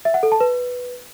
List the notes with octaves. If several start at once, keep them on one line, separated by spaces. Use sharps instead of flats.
E5
F#5
A4
A5
B4